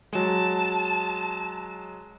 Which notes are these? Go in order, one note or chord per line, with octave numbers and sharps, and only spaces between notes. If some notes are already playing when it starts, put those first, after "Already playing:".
F#3 G#3 A5